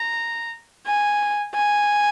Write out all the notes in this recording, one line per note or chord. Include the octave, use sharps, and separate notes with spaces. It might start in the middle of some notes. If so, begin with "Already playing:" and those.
Already playing: A#5
G#5
G#5